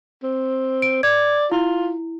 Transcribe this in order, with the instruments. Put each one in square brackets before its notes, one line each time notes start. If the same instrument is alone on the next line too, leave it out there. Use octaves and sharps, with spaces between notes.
[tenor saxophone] C4
[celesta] D7
[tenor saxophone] D5 [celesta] G#6
[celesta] E4 [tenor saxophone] F4